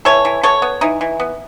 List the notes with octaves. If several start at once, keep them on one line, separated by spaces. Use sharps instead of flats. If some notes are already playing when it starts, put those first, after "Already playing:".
E3 A4 C#5
E3
B3 A4 C#5
B3
E3 D#4
E3
B3